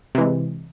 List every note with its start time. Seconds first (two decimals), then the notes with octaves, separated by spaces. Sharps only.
0.15 C3
0.18 E3
0.21 G#3